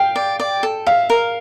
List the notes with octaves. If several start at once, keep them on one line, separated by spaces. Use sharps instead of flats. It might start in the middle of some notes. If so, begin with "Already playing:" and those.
Already playing: F5 G5
D5
D5
A4
E5 F5
A#4